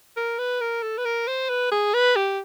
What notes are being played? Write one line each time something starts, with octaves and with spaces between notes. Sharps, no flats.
A#4
B4
A#4
A4
B4
A#4
C5
B4
G#4
B4
G4